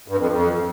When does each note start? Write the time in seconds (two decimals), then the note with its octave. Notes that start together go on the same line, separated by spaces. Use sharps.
0.08 G2
0.19 F2
0.29 F2